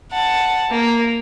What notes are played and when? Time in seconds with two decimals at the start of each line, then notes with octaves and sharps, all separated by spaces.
0.12 F#5 A5
0.70 A#3